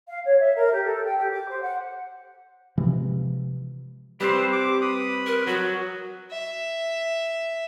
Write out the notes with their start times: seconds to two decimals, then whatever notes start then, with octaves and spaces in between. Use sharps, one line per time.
0.07 F5
0.25 C#5
0.39 E5
0.55 A#4
0.72 G4
0.84 A4
1.04 G5
1.19 G4
1.32 D6
1.49 C5
1.61 F#5
2.78 C3 E3 F3 G#3
4.20 G3 C4 G4 B4 C5
4.52 D6
4.81 B4 B5 D#6
5.26 A#4
5.47 F#3 F#4
6.31 E5